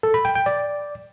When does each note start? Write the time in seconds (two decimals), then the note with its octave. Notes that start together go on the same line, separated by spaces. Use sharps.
0.03 A4
0.14 B5
0.25 G5
0.35 G5
0.46 D5